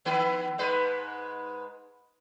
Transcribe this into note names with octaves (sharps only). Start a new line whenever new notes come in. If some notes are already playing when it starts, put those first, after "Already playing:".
D#3 B3 B4
G#2 G#3 B4